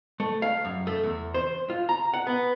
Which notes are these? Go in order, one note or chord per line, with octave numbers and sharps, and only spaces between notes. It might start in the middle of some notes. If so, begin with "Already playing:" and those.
A3
F5
F#2
A3
E2
C5
F4
A#5
F#5
B3